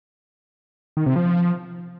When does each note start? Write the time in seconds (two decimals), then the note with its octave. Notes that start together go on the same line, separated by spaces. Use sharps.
0.97 D#3
1.06 C3
1.16 F3